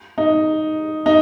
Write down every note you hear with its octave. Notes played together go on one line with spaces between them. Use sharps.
D#4
D#4